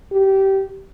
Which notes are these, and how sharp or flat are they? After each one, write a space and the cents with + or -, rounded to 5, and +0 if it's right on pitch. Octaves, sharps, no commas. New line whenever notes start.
G4 -20